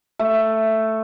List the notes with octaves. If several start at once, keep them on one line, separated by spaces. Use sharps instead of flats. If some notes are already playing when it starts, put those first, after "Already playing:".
A3